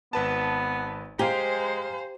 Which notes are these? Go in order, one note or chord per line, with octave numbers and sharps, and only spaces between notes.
G#1 B3 B4 A5
G#3 G4 C5 F5 G#5 A#5